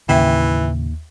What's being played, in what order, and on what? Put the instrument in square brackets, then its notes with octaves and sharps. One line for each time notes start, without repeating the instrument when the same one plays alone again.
[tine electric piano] D#2 [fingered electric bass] A2 C#3 C#4 [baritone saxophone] E3 [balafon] E5 G5